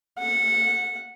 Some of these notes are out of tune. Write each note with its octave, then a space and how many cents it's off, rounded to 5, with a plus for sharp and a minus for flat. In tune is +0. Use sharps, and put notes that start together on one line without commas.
F#5 -15